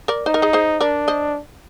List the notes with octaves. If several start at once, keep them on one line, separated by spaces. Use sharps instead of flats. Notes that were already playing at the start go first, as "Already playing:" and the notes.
A#4 D5
D#4 C5
A#4
G#4 C5
G#4 C5
D4 A#4 D5
C5 D#5